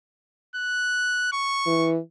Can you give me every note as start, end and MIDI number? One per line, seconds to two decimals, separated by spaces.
0.56 1.31 90
1.33 1.91 85
1.67 1.99 52